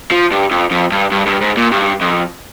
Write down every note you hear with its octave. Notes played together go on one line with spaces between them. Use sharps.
F3
G2
F2
F2
G2
G2
G2
G#2
A#2
G2
F2